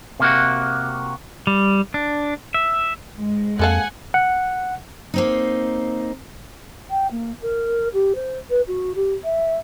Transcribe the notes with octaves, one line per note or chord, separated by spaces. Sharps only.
C3 A#3 F#4
G3
D4
E5
G#2 G#3
F2 A#3 A4 F5 F#5 G#5
F#5
A#3 C4 D#4
G5
A#3
A#4
G4
C5
B4
F#4
G4
E5